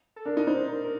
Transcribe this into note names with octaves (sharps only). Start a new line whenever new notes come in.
A4
D4 A#4
D#4
D#4 C5
A#4
A#4